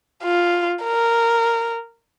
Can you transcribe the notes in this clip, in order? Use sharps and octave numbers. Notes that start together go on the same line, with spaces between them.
F4
A#4